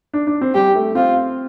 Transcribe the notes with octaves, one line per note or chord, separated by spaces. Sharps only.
D4
D4
C4
G3 G4
A3
C4 F4